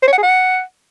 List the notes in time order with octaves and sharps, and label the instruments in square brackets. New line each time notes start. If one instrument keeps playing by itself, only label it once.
[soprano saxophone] C5
C#5
F#5
G#4
F#5